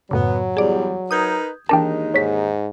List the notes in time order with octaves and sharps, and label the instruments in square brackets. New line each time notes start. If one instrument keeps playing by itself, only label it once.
[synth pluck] F#2 A2 C#3 [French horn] F#3 [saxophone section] B3
[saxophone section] E2 G3 [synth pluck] G#4 D5
[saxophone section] D#4 A#4 B4 [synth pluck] D#6 G6 G#6
[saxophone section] D#2 G#3 D#4 [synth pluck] E3 D4 A#4 [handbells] G5 A5
[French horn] G#2 [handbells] C#5 B6